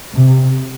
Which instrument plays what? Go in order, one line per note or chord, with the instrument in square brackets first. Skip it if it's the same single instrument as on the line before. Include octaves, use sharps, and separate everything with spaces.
[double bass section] C3